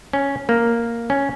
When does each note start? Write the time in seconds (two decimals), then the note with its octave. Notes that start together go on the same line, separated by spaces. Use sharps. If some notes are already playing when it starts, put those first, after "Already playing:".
0.13 C#4
0.49 A#3
1.10 C#4